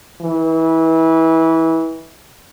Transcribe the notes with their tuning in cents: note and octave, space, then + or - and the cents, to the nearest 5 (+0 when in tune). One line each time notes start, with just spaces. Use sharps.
E3 -25